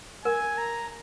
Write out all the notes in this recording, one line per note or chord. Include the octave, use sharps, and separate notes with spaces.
A#4 G#5
A#5